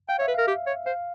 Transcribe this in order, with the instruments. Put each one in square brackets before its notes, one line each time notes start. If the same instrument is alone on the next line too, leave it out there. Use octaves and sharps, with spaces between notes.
[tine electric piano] F5 [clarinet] G5
[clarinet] C#5 [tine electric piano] E5
[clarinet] B4
[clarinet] A#4 [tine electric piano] F5
[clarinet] G4
C#5
[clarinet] C5 [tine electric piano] F5